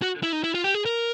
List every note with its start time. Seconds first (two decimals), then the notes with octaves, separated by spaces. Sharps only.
0.02 F#4
0.23 E4
0.33 D#4
0.44 E4
0.55 F4
0.64 G4
0.74 G#4
0.86 A#4